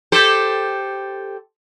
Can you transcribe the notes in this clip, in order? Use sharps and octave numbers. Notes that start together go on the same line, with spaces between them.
G4 A4 C5